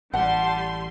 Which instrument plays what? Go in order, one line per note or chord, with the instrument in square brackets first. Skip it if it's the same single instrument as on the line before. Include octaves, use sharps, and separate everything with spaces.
[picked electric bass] A1 [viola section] G3 C6 [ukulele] F#5 [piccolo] A5